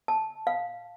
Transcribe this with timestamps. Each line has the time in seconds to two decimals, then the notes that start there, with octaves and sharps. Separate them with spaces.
0.08 A5
0.47 F5